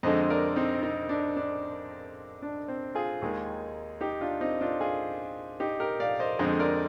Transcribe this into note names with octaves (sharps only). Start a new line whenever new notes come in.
F2 D3 G#3 C5 D#5
A#4 D5
C4 D#4
C4 D#4
D4
D4
D4
C4
F4 G#4
D#2 D#3 G#3
D#4 G4
D4 F4
C4 D#4
D4 F4
F4 G#4
D#4 G4
G4 A#4
D5 F5
C5 D#5
F2 D3 G#3 C5 D#5
A#4 D5